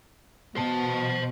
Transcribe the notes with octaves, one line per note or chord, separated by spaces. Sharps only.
B2 C5 A5